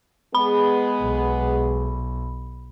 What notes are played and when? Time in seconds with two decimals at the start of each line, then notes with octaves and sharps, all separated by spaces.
0.35 G#3 B3 G#4 B5
1.01 B1